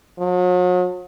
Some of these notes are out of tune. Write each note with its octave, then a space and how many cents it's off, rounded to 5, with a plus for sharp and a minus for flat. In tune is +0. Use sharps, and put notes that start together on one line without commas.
F#3 -40